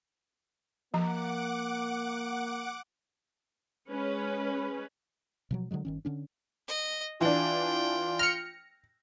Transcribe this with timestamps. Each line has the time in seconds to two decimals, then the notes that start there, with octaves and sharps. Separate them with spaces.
0.94 F3 A#3 F#5 A#5 D6
3.89 G#3 C#4 B4
5.51 B2 F3 F#3
5.71 D3 E3 F#3 G#3
5.85 G1 D#3 C#4
6.05 D3 C#4 D4
6.68 D#5
7.21 E3 D4 F4 G5
8.19 F6 A#6 C#7